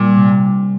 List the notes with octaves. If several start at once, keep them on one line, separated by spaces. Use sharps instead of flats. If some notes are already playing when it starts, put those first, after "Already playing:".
Already playing: A#2 G3 D4
C3